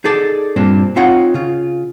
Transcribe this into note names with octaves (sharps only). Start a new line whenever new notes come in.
D#4 G#4 A4 D5
G2 A#2 C4 D4
C4 D#4 F4 C#5 F#5
C#3 F4